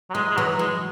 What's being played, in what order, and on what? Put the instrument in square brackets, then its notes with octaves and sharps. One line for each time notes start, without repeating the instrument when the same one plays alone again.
[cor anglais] F#3
[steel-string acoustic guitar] E3 [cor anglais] G#3
[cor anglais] G#3
[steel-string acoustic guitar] E3 [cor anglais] F#3
[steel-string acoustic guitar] F#3 [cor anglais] G#3